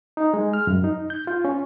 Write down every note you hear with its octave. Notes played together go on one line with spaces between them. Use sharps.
D#4
G#3
F6
F#2
D#4
G6
F4
C#4